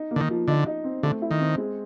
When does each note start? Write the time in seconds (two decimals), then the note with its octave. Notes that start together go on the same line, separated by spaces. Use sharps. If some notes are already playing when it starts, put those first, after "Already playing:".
Already playing: D#4
0.11 A#3
0.16 D3
0.20 D#3
0.30 F3
0.48 D3 D#4
0.66 D#4
0.84 C4
1.03 D3 A3
1.22 E4
1.31 D#3
1.40 C4
1.58 G#3